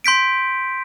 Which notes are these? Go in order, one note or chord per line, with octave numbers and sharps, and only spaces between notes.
C6 G6 B6 D7